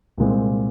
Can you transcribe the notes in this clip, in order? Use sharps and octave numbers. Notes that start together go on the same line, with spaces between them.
C2 A#2 G#3 C4